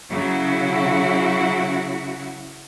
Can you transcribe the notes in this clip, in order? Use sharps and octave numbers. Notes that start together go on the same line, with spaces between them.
C#3 F#3 E4 F#4